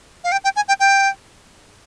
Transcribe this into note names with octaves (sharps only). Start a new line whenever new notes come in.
F5
G5
G5
G#5
G5
G5